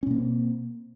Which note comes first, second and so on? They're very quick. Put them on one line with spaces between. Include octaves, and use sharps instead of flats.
C#4 B2 A#3 C4